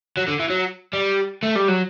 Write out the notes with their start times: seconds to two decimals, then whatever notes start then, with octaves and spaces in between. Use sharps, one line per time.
0.17 F#3
0.27 D3
0.39 E3
0.50 F#3
0.93 G3
1.43 A3
1.56 G3
1.68 F#3